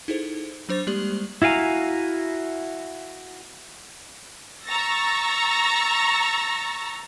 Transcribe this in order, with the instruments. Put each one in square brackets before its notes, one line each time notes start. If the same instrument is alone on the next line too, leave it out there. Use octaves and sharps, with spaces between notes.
[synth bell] D#4 E4 G#4 A4 C5
F#3 D4 C5 C#6 A6
G3 G#3 A#3 G4 D5 F#7
[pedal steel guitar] E4 F#4 F5 G#5 A#5
[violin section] A#5 C#6 E6 A6 A#6